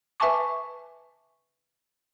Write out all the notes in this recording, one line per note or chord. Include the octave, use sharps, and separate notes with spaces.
B4 E5 G#5 A5 C#6 D6